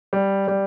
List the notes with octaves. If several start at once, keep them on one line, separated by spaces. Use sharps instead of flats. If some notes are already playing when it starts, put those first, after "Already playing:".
G3
G3